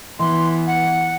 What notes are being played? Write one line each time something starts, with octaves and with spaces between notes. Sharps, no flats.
E3 B3 C6
F#5